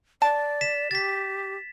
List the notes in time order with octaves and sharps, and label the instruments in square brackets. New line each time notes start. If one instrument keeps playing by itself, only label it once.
[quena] D5 [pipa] A5
[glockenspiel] B6 E7
[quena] G4 [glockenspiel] A6 B6